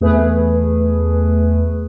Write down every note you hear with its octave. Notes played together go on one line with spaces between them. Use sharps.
E2 A3 G#4 B4